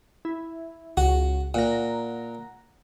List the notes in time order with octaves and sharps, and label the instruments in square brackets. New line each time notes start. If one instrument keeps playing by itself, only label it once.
[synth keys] E4
[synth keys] C#2 [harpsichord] F#4
[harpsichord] A#2 [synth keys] F#5 A#5